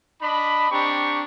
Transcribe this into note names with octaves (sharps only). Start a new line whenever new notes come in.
D4 D#5 B5
C4 D4 G4 A#5 C#6